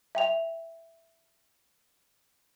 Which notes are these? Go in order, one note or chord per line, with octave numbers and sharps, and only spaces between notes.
E5 G5 F7